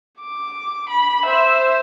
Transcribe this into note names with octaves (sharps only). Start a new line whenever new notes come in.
D6
B5
C5 E5